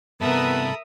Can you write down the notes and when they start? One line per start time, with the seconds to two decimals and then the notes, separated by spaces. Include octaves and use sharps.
0.21 G2 C3 B3 A4 A#4 E5 B5 D#6